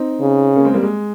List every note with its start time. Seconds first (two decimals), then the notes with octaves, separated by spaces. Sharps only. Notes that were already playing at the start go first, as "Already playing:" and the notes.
Already playing: C4 D#4
0.21 C#3
0.56 A#3 C#4
0.65 G#3 C4
0.74 G3 A#3
0.83 G#3